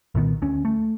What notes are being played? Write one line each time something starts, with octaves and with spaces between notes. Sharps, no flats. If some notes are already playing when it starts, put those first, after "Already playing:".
C2 A#2 D#3 B3
D2 C#4
A3